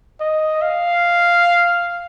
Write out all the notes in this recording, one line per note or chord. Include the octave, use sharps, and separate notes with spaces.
D#5
F5